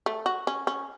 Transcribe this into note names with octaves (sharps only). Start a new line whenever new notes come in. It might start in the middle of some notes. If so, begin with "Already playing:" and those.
A3
F#4
C#4
C#4